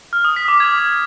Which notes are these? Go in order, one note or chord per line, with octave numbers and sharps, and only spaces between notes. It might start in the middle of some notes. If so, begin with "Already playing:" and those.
F6
D#6
B6
D6
G#6